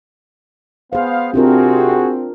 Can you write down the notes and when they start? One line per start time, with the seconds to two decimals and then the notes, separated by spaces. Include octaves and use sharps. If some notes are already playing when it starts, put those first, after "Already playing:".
0.93 B3 G#4 C5 F5
1.34 C3 C4 D4 F4 F#4 G#4 A#4